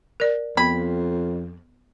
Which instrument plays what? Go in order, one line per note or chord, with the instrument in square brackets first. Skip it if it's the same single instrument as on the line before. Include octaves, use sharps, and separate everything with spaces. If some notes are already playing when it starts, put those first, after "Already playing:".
[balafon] A#4 D5
[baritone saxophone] F2 [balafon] B3 [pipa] B5